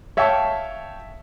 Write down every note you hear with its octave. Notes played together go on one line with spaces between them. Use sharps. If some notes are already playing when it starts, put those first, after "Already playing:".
C#5 E5 F5 G5 A5 C#6